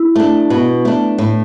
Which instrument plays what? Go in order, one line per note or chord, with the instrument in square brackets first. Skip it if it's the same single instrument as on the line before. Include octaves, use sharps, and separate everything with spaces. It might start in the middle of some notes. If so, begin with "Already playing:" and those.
Already playing: [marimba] E4
[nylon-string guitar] A3 D4
B2
A3 D4
A2